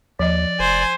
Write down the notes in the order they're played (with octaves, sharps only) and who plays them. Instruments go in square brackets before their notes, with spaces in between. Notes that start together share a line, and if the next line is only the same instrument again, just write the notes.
[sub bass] D#2 [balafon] F3 D#5 [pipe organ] D5
[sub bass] F1 [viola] C5 G#5